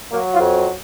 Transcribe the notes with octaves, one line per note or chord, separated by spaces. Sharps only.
F#3 A#3
F4
F2